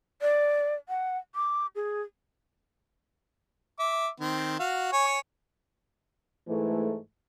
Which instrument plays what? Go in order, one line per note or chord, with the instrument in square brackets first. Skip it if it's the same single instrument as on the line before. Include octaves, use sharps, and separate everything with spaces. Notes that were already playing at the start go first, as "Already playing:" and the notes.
[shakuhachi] D5
F#5
D6
G#4
[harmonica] E5 D6
D#3 C4
F#4 F5
C#5 G#5
[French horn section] G#2 E3 G#3 A3